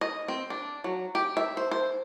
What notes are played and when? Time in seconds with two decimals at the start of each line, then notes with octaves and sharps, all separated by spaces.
0.01 D#5
0.28 C4
0.50 D4
0.84 F#3
1.15 G4
1.37 E5
1.57 C5
1.71 C5